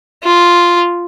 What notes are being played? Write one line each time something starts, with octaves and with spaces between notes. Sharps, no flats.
F4